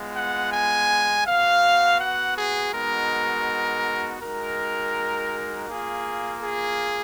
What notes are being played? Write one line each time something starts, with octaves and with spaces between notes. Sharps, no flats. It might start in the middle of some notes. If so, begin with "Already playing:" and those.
Already playing: G#3 B3 F4
F#5
G#5
B3 F#4 F5
F#5
G#4
G#3 B3 D#4 F#4 A#4
G#3 D#4 F#4 A#4
A#3 F4 G#4
G#4